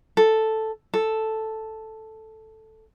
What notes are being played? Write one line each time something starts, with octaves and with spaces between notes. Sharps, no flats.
A4
A4